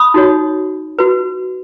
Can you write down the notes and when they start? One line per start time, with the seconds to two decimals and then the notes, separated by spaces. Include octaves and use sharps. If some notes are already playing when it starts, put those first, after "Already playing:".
Already playing: B5 D#6
0.14 D#4 F#4 C#5
0.99 F#4 B4